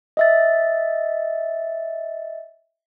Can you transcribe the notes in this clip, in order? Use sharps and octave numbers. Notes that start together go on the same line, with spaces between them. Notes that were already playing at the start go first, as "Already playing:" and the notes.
D#5 E5 A6